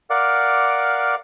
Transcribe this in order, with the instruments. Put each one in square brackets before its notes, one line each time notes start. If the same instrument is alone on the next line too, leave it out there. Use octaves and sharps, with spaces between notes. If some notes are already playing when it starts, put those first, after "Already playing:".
[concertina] A#4 D5 F5 F#5 D6